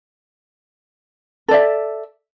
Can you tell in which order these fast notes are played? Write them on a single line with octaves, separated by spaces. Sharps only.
A4 D5 E5